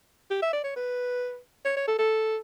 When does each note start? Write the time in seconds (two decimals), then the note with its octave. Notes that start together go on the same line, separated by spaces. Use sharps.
0.31 G4
0.42 E5
0.53 D5
0.64 C#5
0.76 B4
1.65 C#5
1.77 C#5
1.88 A4
1.99 A4